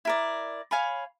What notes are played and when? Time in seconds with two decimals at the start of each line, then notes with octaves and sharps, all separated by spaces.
0.05 E4 A#4 D5
0.71 C#5 F5 G#5 B5